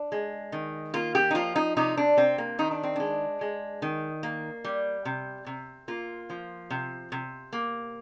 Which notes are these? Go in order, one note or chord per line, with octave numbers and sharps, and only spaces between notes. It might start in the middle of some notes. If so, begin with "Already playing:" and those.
Already playing: D4
G#3
D#3
A#3 F4
G4
D#4
F3 F4
D#4
C3 D#4
D4
C3 C4
A#3
D#3 D#4
D4
C4
G#3 D4
G#3
D#3
A#3
G3
C3
C3
A#3 F4
F3
C3
C3
A#3